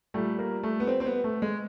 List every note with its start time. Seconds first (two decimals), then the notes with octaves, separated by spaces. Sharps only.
0.14 A#2 G3 A3
0.39 A#3
0.63 A3
0.80 B3
0.87 C4
1.00 C4
1.06 B3
1.24 A3
1.42 G#3